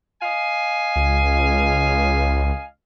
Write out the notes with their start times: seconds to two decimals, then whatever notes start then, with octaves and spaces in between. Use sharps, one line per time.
0.22 D#5 F5 G#5
0.96 C#2